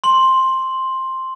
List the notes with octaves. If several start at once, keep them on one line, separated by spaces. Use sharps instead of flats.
C6 F#7